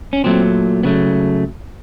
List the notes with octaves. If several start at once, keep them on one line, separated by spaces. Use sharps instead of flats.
C#4
A#2 F#3 A3 C4
C#3 F#3 A3 B3